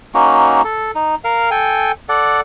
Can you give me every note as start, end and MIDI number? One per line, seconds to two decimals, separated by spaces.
0.14 0.62 58
0.14 0.62 61
0.14 0.62 63
0.14 0.62 66
0.64 0.91 69
0.95 1.15 63
1.24 1.50 70
1.24 1.50 77
1.51 1.92 69
1.51 1.92 79
1.51 1.92 80
2.09 2.41 69
2.09 2.41 74
2.09 2.41 78